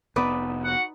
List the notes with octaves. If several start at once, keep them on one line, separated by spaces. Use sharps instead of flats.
F1 B3 D#4 B4 D5
F#4 F#5